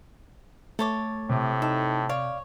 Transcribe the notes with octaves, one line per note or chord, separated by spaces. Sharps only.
A3 A4 C#5 D6
A2 C3
D#4 A4
C#5 D5 F5 D6